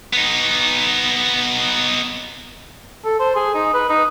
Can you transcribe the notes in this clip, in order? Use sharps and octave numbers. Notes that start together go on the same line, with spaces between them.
B3 D#4
A4
C5
G#4
D#4
B4
D#4